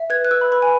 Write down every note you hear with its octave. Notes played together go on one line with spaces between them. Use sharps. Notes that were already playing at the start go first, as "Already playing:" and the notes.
Already playing: E5
B4 G#6
F#6
B4 E6
B5
B4 B5
G#5